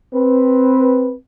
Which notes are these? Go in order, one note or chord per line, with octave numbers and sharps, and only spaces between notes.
C4 B4